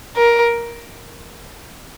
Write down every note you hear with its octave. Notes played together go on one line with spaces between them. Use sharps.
A#4